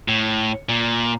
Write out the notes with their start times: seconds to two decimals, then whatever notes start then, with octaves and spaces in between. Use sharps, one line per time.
0.08 A2
0.69 A#2